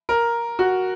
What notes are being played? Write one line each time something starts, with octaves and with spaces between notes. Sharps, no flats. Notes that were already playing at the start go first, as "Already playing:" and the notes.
A#4
F#4